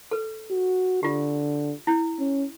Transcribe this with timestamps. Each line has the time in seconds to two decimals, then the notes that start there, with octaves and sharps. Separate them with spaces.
0.11 A4 B4
0.51 F#4
1.03 D3 F4 G4
1.87 E4
2.19 C#4